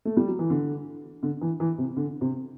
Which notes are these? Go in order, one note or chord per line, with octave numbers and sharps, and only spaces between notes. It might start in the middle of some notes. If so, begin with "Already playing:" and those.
A3
G3
F#3
E3
D3
D3
E3
E3
C3
D3
C3